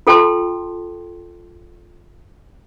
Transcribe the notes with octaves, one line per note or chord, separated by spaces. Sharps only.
F4 A4 G5 A5 C6